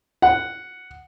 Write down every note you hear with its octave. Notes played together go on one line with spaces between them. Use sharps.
F#5